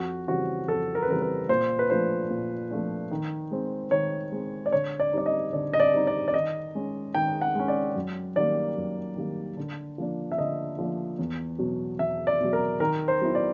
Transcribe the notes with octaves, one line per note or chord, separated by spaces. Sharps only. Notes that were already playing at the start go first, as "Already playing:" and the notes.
Already playing: F2 F#4
C#3 E3 G3 C4 F#4
F2 A4
A#4
B4
C#3 E3 G3 C4 A#4
B4
A#2 C5
B4
F3 A3 D4 C5
A#2
F3 A3 D4
D#3
G#3 C4
D#3 C#5
G#3 C4
D5
D3 C#5
D5
G3 C4 D#4 D5
D#5
D3 D5
D#5
D5
G3 C4 D#4
D5
D5
D#3 D#5
G#3 C#4
D#3 G5
F#5
G#3 C#4
D5
F#2
D#3 G3 A#3 D5
F#2
D#3 G3 A#3
D3
F3 A#3 D4
E5
D3 D#5
F3 A#3 D4
E2
B2 F#3
E2 E5
D5
B2 F#3
A#4
D#3 A#4
C5
F#3 B3 E4
D5